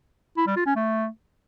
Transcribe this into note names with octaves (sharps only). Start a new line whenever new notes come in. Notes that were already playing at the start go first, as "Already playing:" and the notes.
E4
G3
F4
C#4
A3